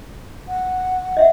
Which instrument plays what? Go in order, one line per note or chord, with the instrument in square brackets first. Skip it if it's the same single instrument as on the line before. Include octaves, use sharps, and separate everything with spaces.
[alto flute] F#5
[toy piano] D#5 E5 F#5